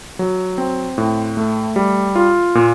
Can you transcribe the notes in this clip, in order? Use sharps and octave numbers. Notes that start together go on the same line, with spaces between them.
F#3
C4
A2
A3
G3
F4
A#2